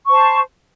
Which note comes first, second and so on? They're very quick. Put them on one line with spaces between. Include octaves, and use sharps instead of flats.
C#6 C5 A5